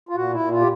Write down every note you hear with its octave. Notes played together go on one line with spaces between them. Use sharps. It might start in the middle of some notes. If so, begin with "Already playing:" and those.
F4
A#2 F#4
E4
A#2
F4
G4